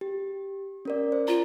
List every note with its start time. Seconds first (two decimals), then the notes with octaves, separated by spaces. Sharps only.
0.01 G4
0.85 C#4 A#4 D5
1.12 C5
1.28 F4 A#5